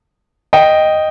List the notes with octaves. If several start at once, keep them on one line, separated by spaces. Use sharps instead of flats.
D#5 G5